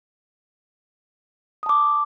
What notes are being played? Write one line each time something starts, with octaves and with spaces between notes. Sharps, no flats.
A5 D6 D#6